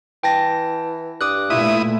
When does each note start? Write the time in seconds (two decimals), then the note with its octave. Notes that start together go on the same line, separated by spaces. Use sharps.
0.23 E3 G5 A5 A#6
1.21 G2 D6 D#6 F#6
1.50 A#2 A3 E4 F4 D#6